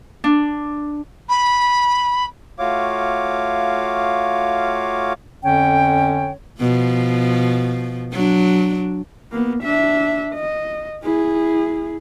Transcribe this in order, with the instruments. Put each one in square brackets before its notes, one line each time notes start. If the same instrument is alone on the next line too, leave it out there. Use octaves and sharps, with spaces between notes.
[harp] D4
[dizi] B5
[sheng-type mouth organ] A3 F4 F#4 C#5 F5 D6
[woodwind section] F2 D3 C#4 C#5 G5
[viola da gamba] B2 F3
F#3 D4
[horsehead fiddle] A#3 B3
D4 E5
D#5
E4 G#4